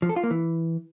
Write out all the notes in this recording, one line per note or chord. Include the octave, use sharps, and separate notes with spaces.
F3
A4
F4
A#3
E3